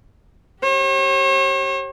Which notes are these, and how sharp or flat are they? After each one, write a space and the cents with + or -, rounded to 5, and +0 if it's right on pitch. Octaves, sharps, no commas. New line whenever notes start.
G4 -25 C#5 -45